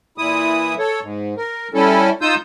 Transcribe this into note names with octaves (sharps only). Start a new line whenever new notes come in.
A#2 E3 E4 D#6
A4 C#5
G#2
A#4
G3 C#4 E4 A4
D#4 F4 D#6 E6 G6